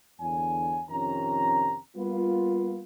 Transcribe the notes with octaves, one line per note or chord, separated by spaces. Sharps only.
E2 D3 C#5 G#5
F2 C3 D#3 C#4 A#5
G3 A#3 B3 F4